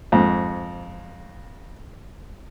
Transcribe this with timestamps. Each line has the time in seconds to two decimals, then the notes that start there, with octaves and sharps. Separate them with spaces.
0.12 F2 G#2